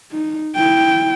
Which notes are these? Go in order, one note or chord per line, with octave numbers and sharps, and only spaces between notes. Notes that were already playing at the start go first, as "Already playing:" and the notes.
D#4
E4 G5